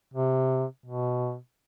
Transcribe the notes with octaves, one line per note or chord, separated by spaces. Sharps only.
C3
B2